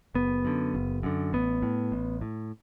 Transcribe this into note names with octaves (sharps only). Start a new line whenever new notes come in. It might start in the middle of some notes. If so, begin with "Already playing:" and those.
F#1 B3
F#2 D3
F#1
F#2 D3
A1 B3
A2
A1
A2